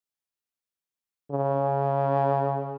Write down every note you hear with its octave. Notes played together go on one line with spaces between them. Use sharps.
C#3